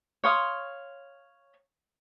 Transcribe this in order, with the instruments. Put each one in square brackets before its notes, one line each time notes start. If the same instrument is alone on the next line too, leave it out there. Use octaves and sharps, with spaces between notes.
[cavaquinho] C#5 F5 C6 D#6